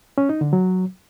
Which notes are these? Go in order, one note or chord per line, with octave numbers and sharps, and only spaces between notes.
C#4
D#4
D3
F#3